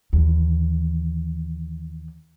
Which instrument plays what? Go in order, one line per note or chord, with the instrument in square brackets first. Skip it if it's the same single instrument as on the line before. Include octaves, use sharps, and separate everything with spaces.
[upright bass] D#2 E3